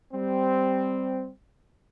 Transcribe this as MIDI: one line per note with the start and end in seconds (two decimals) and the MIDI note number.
0.14 1.29 55
0.14 1.29 60